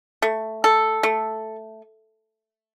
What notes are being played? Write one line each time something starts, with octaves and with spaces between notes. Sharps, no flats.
A3
A4
A3